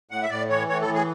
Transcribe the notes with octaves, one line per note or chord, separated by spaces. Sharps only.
A2 F#5
E5
A2 D5
E3 C#5
A2 C#5
A4
E3
G#4